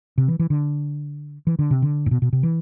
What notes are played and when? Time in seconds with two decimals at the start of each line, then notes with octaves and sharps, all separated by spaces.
0.18 C3
0.28 E3
0.39 E3
0.50 D3
1.47 E3
1.59 D3
1.71 C3
1.82 D3
2.06 A2
2.11 B2
2.22 B2
2.33 C3
2.43 E3